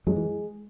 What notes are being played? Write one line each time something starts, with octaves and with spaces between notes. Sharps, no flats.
F#2 F#3 G#3
E3